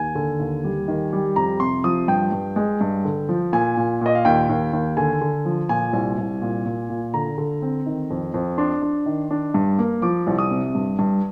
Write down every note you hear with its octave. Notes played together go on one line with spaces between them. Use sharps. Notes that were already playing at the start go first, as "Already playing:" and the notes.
Already playing: D#2 G#5
D3
D#2
G3
D#3
G3
F2 A#5
C3 C6
F3 D#6
G2 G5
G2
G#3
G2
D3
F3
A#2 G#5
A#2
A#2 D#5
F5
D#2 G5
D#2
D#2
D3 G#5
D3
F3
A#2 G#5
C2
C2
A#2
A#2
A#2
D3 A#5
D3
C4
D#3
F2
F2
D4 C6
D4
D#3
D4
G2
A#3
F3 D6
C2
D#6
C3
G2
G2